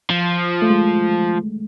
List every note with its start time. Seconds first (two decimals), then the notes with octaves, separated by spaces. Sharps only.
0.10 F3
0.62 A3
0.70 G#3